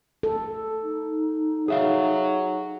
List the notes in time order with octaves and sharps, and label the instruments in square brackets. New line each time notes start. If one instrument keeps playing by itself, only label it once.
[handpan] A4
[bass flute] D#4
[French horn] F#3 [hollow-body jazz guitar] G#4 E5 F5